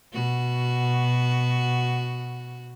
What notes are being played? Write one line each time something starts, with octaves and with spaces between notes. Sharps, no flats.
B2 F#4